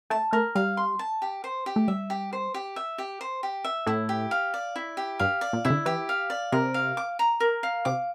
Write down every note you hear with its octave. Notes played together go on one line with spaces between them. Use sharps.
A3 A5
A3 A#4
G3 F5
C6
A5
G4
C5
G4
A3
G3 E5
G4
C5
G4
E5
G4
C5
G4
E5
A2 E4
G4
F5
D5
E4
G4
G2 F5
D5
A#2
C3 E4
D3
E3 G4
F5
D5
C3 A#4
F5
D6
A#5
A#4
F5
C3 D6